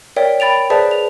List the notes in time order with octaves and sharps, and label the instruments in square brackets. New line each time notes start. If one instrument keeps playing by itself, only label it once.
[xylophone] A#4 C#5 D5 E5 G5
G5 B5 A6 D7 F7
G#4 B4 C5 D5 E5 A5
F7